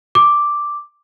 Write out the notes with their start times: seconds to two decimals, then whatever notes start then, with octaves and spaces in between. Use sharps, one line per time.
0.15 D6